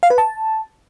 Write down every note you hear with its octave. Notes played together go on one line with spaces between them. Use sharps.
F5
B4
A5